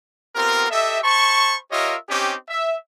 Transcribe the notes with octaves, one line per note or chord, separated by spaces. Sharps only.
B3 C4 F4 G4 A#4
G4 A4 D#5 E5
C5 A5 B5 C#6
F4 G4 A#4 C#5 D#5 E5
C4 C#4 D#4 G4
E5